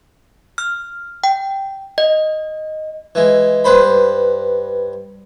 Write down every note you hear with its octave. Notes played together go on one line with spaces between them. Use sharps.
F6
G5
D#5
E3 G#3
G2 B4 C5 B5